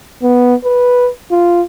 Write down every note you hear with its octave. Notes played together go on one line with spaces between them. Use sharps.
B3
B4
F4